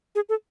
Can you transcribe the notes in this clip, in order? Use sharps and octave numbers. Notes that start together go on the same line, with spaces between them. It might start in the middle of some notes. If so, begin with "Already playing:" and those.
G#4
A4